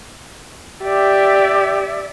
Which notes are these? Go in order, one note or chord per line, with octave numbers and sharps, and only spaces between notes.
G4 D5 E5